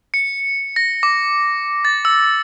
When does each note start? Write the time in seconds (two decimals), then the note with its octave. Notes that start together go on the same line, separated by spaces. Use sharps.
0.14 C#7
0.76 A#6
1.03 D6
1.85 A6
2.05 E6